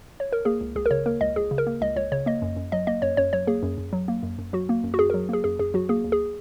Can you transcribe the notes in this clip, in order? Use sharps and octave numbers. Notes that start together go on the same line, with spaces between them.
C#5
A#4
A#3 G#4
C#2
C#2 G#4
A#4
C#3 C#5
A#3 A#4
C#2 D#5
C#2 G#4
C#3
A#4
A#3
C#2 D#5
C#2 C#5
C#3 C#5
A#3 D#5
F#2
F#2
F#3 D#5
A#3 D#5
F#2 C#5
F#2 C#5
F#3 C#5
A#3 G#4
F#2
F#2
F#3
A#3
F#2
F#2
F#3 F#4
A#3
F#2
F#4
F#2 G#4
A#4
F#3
A#3 G#4
F#2 G#4
F#2 G#4
F#3 F#4
A#3 G#4
D#2
G#4